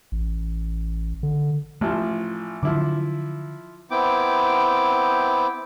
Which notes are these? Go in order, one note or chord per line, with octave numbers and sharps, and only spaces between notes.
A1
D3
A1 F3 A3
D3 F3 F#3 E4 D6
B3 C4 E4 G5 D6